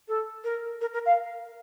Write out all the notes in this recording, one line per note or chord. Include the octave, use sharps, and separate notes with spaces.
A4
A#4
A#4
A#4
F5